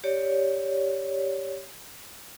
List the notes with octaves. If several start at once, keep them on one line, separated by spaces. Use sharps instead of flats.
G4 C#5 D5